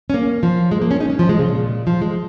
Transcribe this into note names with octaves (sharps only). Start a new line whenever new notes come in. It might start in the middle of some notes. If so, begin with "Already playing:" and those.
C#4
A#3
F3
G#3
A#3
C#4
D#4
C#4
F3
G#3
C#3
A#2
F3
G#3